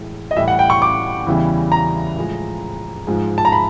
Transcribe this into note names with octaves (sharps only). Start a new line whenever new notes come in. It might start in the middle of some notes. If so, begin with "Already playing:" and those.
Already playing: A2 E3 G#3
D#5
A2 E3 G3 E5
F#5
G5
C#6
D6
E2 C#3 E3 G3
A#5
A2 F3 G#3
G#2 F3 G#3
A5
A#5
B5